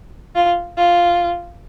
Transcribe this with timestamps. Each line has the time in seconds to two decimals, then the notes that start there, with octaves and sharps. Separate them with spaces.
0.35 F4
0.77 F4